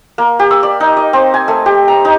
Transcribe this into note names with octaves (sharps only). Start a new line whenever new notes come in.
A#3
G4
E6
D5
D#4
D#5
C4
G#5
A3
G4
A#5
D#4